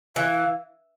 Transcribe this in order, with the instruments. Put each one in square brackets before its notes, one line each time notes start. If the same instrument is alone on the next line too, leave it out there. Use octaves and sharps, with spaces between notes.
[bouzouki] E3 [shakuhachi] F5